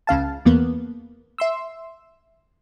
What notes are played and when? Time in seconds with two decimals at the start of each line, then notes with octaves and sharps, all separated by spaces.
0.07 C#2 C#3 F5 A5
0.45 E2 A#3 B3
1.38 E5 C6 E6